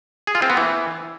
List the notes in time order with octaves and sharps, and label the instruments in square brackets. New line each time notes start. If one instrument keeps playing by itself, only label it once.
[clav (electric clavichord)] G#4
F4
C4
B3
E3